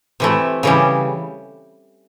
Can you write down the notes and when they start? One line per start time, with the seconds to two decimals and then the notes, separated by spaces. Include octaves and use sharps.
0.20 C3 E3 A3
0.63 C#3 E3 G3